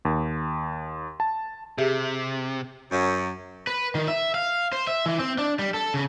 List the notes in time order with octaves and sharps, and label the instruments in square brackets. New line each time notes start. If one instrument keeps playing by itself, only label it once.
[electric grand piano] D#2
A5
[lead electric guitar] C3 [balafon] G4 G#4 E5
[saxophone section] F#2
[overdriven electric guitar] B4
D#3
E5
F5
C5
E5
E3
C4
D4
G3
A4
C#3